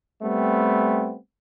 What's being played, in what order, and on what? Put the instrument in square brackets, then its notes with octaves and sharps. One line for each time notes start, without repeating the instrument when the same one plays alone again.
[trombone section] G3 A3 B3 C4